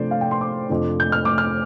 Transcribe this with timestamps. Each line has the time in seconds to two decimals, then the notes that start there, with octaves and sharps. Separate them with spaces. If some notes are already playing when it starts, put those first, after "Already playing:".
Already playing: C3 F3 A3 D4 C5 D5
0.11 F5
0.21 G5
0.31 C6
0.41 D6
0.69 F2 C3 F3 A3 D4
1.00 G6
1.12 F6
1.25 D6
1.38 F6